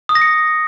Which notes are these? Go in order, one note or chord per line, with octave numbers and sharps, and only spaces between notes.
D#6
A#6
C#7